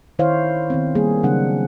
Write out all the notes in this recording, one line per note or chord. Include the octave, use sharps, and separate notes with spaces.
D#3 E4 C5 C#5 F5
D#3 B3 C4
G3 A#3 G#4
C#3 F#3 C4 D4 F#5